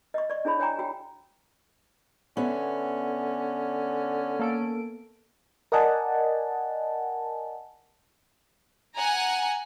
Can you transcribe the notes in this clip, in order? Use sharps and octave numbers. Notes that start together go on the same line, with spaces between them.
D#5 C#6
D5 C#6
D4 E4 G#4 C#5 B5
C#5 G5 G#5 A#5 C#6
F#4 G5
D3 B3 C#4 C#5 E5
A#3 A4 D7
A#4 D5 D#5 F#5 G#5 A5
F#5 G#5 A#5